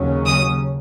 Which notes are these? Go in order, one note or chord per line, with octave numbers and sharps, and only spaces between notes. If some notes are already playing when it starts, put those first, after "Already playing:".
Already playing: D#2 C#3 F#3 C#4
D#6